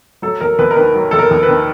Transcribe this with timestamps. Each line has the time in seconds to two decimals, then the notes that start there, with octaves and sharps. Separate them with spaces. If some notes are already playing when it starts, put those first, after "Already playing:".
0.22 F#3 A4
0.41 D#2 A#4
0.59 D#2 B4
0.71 A#4
0.77 D#3 B4
0.95 F#3
1.11 D#2 A4
1.19 A#4
1.31 D#2
1.43 B4
1.49 D#3